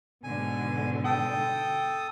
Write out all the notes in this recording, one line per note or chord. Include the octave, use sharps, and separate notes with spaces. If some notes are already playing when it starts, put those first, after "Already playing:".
G#2 B2 D3 G#5
A4 G5 D#6